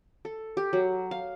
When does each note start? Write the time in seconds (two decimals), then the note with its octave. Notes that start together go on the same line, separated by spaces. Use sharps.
0.25 A4
0.57 G4
0.73 F#3
1.11 F5